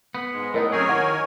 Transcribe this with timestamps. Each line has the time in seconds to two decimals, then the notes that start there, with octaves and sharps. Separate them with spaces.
0.15 B3
0.33 G#2 G#3
0.54 A2 B3 D#4 A#4 D#5
0.72 F#2 C4 G#4 A#4 C#5 G#5 C#6
0.88 D#3 E4 F#5 C#6